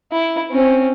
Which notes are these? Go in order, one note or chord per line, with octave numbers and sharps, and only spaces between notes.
E4
C4 C#4